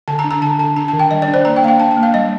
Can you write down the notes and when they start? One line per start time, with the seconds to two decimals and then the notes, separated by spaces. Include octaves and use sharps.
0.08 D3 A5
0.19 A#5
0.24 D4
0.31 A#5
0.42 D3 A5
0.59 D3 A5
0.76 D4 A#5
0.88 A5
0.93 D#3
0.99 G5
1.11 G3 D#5
1.22 D5
1.28 D4
1.34 C5
1.45 A#3 A#5
1.56 G5
1.63 A#3 F5
1.68 G5
1.80 D4 A5
1.91 A5
1.97 A#3
2.03 F5
2.14 G3 D#5